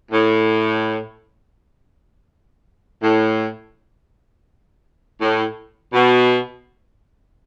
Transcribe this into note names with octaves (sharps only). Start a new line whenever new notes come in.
A2
A2
A2
B2